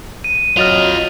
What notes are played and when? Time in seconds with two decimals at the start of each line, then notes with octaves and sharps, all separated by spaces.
0.24 D#7
0.57 F#3 F4 D#5 F6 A6 F7